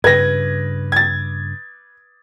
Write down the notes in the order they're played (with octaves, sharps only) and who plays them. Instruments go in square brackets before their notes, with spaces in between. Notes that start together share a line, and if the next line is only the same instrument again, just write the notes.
[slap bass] G2 C#3 [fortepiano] B4 [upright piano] G#6 A#6
[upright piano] G#6 A6